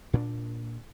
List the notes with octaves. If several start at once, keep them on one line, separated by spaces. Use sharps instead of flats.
A#2 C#4 D4